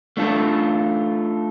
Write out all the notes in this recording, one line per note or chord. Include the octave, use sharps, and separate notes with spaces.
A3 D4 F4 A4